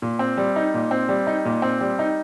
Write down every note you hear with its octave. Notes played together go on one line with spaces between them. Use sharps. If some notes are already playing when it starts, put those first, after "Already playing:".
A#2
C4
G3
D#4
A#2
C4
G3
D#4
A#2
C4
G3
D#4